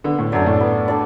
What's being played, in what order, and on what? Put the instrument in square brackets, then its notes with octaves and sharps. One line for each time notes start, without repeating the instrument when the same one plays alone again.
[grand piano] D3 [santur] B3
[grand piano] A2
[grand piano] F#2 [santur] D4 A4 D5
[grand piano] A2
[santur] B3
D4 A4 D5